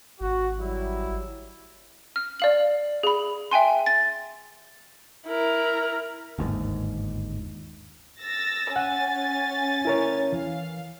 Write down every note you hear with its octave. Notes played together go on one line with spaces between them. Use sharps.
G#1 F#4
F#3 G3 E4
F6
D5 F5 F#7
G#4 B5
E5 G5 G#5 C6
A6
E4 A#4
G1 D#2 G#2
E6 A6 A#6
C#4 F#5 G#5 A6
E4 A#4 C#5
E3 F5